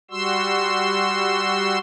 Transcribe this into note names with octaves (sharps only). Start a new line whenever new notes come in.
G3 F#4 C6 E6